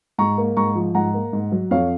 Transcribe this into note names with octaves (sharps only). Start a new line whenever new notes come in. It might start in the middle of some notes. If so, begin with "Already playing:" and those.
G#2 A#5 C#6
A#3
G#2 A#5 C#6
F3
G#2 F#5 A#5
A#3
G#2
F#3
F2 C#5 F5